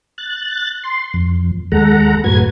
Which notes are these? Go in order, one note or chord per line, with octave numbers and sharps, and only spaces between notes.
F#6 A6
C6
F2
D#2 G#3 A4 F#5 A#5
F#2 A2 F#4 B4 G#6